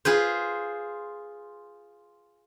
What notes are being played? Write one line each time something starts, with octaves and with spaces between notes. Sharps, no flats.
F4 G#4 B4 C5